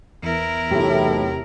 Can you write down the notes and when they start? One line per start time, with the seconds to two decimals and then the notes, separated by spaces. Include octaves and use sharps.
0.22 E2 E4 A#4
0.71 B1 A2 C3 A3 G4